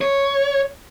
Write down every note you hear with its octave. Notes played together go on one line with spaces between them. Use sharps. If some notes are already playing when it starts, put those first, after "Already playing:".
C#5